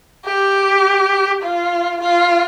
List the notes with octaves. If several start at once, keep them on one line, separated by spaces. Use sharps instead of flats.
G4
F4
F4